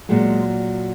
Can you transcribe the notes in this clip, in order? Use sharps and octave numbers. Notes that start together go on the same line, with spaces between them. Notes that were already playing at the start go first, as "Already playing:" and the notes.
A#2 F#3 G#3